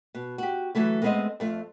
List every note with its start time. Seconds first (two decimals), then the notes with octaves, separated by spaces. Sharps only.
0.15 B2
0.38 F#4 G4
0.75 E3 F#3 A3 E4
1.02 G#3 A3 B3 C4 C5 D#5
1.40 F2 A3 F4